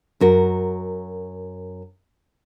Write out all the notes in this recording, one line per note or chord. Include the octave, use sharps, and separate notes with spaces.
F#2 F#4 A#4